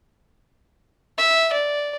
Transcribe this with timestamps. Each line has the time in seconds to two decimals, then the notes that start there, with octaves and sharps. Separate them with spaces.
1.18 E5
1.52 D5